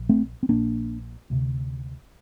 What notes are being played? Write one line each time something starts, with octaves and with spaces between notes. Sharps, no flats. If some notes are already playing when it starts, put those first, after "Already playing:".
Already playing: A#1
A3 C4
C4
A#1 A#2 A#3 D4
D2 C3